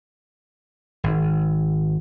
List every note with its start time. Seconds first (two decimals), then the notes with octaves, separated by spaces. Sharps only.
1.04 G#1